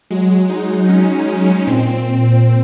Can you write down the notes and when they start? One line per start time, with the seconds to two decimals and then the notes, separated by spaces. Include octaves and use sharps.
0.10 F#3 G#3
0.50 D#4
0.89 C#4
1.28 C#4
1.67 A#2 C4